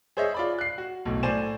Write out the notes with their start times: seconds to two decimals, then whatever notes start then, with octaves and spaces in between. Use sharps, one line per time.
0.17 G#4 C5 C#5 D#5 E5
0.34 F4 D5 B5
0.59 F#6 C7
0.78 F#4
1.05 B1 A2
1.23 A2 C5 D5 G#5 E7